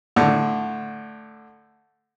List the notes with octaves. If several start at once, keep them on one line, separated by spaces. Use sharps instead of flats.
A2 D3